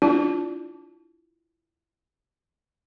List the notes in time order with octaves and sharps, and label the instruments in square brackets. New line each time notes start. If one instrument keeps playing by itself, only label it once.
[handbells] D4 [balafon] E4 F4